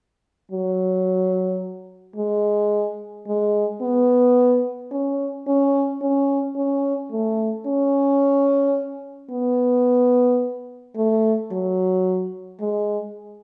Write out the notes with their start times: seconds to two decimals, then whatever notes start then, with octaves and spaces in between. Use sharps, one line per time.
0.51 F#3
2.16 G#3
3.27 G#3
3.81 B3
4.91 C#4
5.47 C#4
6.01 C#4
6.56 C#4
7.11 A3
7.66 C#4
9.31 B3
10.96 A3
11.51 F#3
12.60 G#3